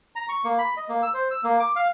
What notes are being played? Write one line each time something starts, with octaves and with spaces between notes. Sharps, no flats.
A#5
C#6
A#3
B5
D#5
A#3
E6
C5
E6
A#3
D6
F5